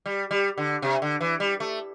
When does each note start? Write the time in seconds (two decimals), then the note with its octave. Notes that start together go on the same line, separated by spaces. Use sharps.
0.06 G3
0.31 G3
0.58 D3
0.82 C3
1.02 D3
1.21 E3
1.40 G3
1.60 A3